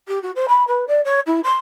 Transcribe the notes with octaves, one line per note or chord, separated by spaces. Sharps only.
G4
F#4
C5
B5
B4
D5
C#5
E4
C6